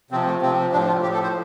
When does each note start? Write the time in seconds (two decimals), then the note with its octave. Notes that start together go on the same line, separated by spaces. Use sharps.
0.11 C3 F3 C4
0.26 A3
0.41 C3 F3 C4
0.72 A2 F3 D4
0.87 F4
1.02 A2 F3 G4
1.14 A4
1.23 C5